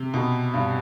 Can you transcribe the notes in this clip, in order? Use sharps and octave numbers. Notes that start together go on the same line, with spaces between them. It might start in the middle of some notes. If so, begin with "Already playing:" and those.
Already playing: C3
B2
G2